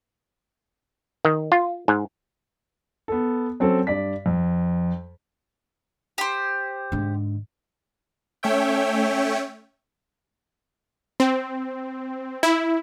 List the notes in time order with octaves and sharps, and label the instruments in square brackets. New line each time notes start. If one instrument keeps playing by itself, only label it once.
[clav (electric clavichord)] D#3
F4
G#2
[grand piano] B3 A4
F#3 C4 C#4 A4
G2 D5 B6
F2
[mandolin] G4 C5
[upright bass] G#2 D3
[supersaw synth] A3 C#4 C#5 E5 G5
C4
E4